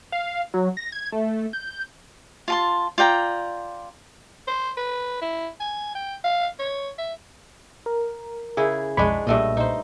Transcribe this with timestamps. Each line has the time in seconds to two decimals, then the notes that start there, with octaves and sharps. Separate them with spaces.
0.12 F5
0.54 F#3
0.77 A#6
0.92 G#6
1.12 A3
1.53 G6
2.48 F4 A5 C6
2.98 F4 D5 G5 A#5
4.48 C5
4.77 B4
5.22 E4
5.60 G#5
5.95 G5
6.24 F5
6.59 C#5
6.98 E5
7.86 A#4
8.57 C#3 E4 G#4
8.97 B1 F2 G#3 D4 C#5 B5
9.27 B1 G2 A#2 A3 D#5
9.57 D#4 C5